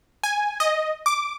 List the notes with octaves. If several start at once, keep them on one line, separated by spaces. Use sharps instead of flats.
G#5
D#5
D6